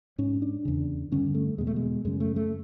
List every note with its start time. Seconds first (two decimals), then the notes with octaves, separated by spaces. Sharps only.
0.18 G#2 C#4
0.42 D4
0.65 E2 C#3
1.12 G2 D3 C#4
1.34 A3
1.58 E2 B2 G#3
1.67 A3
1.76 G#3
2.05 F#2 C#3 G#3
2.20 A3
2.36 A3